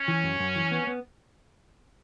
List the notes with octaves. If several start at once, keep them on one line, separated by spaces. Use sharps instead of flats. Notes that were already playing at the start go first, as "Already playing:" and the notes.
Already playing: C#4
E3
F#2
F#2
E3
B3
B3